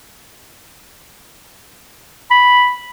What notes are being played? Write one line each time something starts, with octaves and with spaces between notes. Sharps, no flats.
B5